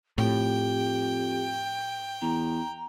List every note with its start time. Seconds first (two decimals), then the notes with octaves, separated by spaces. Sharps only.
0.18 F2 A2 G4 G5
2.21 E2 A#5